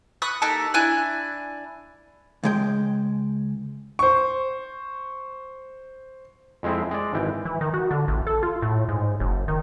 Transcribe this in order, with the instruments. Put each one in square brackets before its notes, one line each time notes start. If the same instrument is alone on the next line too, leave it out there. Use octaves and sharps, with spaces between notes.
[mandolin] B5 C#6 D#6 F#6
A#3 D#4 G4 A4
D4 E4 G#5 F#6
[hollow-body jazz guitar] C#2 G#3 G5
[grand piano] C5 C#6
[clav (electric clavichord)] F2 G#3 C4 E4
G#3 D5
G#1 E3 G5
[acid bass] E3
D#3
F#4
D3
A1
A4
F4
A2
G#2
F#1
D#3